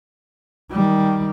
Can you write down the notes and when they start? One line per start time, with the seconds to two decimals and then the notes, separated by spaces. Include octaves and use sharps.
0.71 D#3 G3